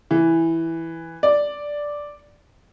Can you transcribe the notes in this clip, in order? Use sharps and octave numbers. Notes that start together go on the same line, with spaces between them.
E3
D5